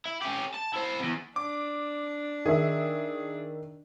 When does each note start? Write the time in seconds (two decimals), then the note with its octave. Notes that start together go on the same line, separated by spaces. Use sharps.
0.05 E4
0.22 C#4 G4
0.54 A5
0.74 E4 C5
1.00 E2 C3
1.36 D4 D6
2.46 D#3 G#4 E5